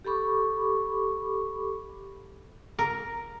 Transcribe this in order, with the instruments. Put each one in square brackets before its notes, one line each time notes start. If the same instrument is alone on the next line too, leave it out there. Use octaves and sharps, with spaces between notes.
[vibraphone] G4 A4 B5 C#6 D6
[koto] A#4